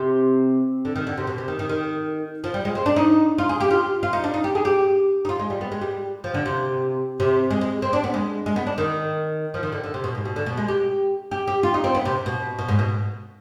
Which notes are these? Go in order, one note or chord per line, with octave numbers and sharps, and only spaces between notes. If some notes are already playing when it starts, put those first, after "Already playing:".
Already playing: C3
D3
D#3
D3
C3
B2
C3
D#3
D#3
D#3
F3
G3
G#3
C4
D4
D#4
F4
G#4
G4
F4
F4
D#4
D4
D#4
G4
G#4
G4
D#4
F4
G#3
G3
B3
G#3
G3
F3
D3
C3
C3
G#3
G#3
C4
D4
B3
G#3
G#3
B3
D4
D#3
F3
D#3
D3
D3
C3
B2
G#2
B2
D3
B2
G#3
G4
G4
G4
F4
D#4
C4
B3
C3
B2
B2
G#2
B2